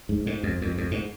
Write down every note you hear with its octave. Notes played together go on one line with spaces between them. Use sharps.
G#2
G#2
F2
F2
F2
G#2